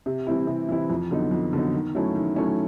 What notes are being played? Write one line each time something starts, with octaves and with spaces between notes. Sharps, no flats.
C3
E3 G3 C4 E4
C3
E3 G3 C4 E4
F2
D3 F#3 B3 D#4
F2
D3 F#3 B3 D#4
D#3
F#3 A3 C#4 E4
D#3
F#3 A3 C#4 E4